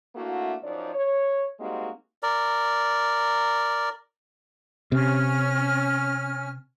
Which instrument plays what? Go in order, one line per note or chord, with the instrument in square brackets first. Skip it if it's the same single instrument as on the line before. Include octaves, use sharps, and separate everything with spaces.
[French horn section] A3 A#3 D4 E4 F#4
F#2 F3 D#4 D5
C#5
G3 G#3 A#3 C4 D#4 F#4
[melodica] A#4 D5
[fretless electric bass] C3 [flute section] C#4 F6